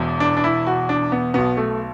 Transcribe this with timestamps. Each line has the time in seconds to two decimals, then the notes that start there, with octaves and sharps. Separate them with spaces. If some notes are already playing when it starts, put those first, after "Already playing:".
Already playing: E1 E2 B2
0.20 D4
0.37 D4
0.44 E4
0.67 F#4
0.89 D4
1.12 B3
1.34 B1 B2 B3
1.57 A3